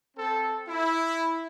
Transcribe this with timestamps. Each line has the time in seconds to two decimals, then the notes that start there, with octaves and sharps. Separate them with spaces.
0.16 C4 A4
0.68 E4